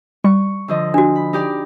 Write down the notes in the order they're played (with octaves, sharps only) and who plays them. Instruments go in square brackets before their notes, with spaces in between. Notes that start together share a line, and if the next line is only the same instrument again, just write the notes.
[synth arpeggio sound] G3 [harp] C#6
[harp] D3 F3 D#5
[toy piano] D4 F#4
[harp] B5
D#4 G4 D5